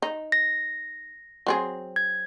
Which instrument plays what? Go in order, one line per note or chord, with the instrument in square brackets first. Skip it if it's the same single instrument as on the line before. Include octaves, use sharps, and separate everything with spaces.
[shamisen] D#4
[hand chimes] A#6
[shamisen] F#3 C4 G#4
[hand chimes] G#6